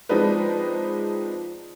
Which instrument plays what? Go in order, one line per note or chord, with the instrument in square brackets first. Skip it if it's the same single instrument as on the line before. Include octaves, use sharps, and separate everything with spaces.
[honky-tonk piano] F3 G#3 C4 D4 D#4 B4